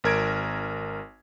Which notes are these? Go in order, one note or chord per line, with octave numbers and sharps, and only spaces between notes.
G#1 A#4 G#6 D7